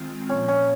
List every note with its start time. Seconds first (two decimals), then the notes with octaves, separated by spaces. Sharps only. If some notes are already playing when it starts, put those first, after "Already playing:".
Already playing: D#3 G#3 C4 F4
0.29 A#2 F3 A#3 C#4
0.48 C#4